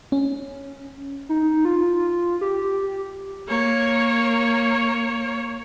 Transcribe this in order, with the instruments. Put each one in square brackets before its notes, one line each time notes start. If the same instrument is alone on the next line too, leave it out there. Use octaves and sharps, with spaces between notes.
[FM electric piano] C#4
[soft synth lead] D#4
F4
G4
[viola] A#3 C#5